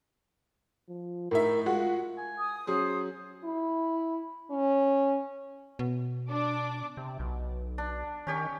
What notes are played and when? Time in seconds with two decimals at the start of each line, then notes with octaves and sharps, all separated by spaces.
0.89 F3
1.31 A2 D#4 A#4 E5
1.66 G#3 F4 F#4
2.18 G#5
2.38 D#6
2.67 F#3 C#4 G#4 C5
3.44 E4
4.50 C#4
5.79 B2
6.29 D4 D6
6.97 C3
7.19 B1
7.78 D4
8.27 D#3 C#4 G4 C#5